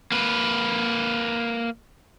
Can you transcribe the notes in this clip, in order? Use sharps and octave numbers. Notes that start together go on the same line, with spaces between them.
A#3 B4